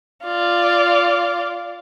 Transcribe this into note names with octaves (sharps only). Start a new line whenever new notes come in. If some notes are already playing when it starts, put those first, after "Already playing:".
F4 D5